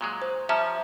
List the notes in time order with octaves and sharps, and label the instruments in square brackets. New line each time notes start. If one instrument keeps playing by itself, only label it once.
[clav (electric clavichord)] A#2 F#3 G#3
[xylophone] C5
[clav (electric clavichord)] F3 G3 C#4 [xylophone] E5 A5 A#5